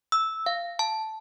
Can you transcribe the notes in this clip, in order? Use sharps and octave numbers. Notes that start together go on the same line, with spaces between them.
E6
F5
A5